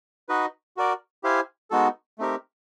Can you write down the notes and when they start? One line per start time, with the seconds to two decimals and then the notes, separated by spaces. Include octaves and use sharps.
0.29 D#4 F#4 B4 D#5
0.77 F#4 A#4 D5
1.24 E4 G4 C5 F5 G#5
1.71 G#3 B3 D#4 F#4 A4
2.19 A3 C4 D#4 G4 A#4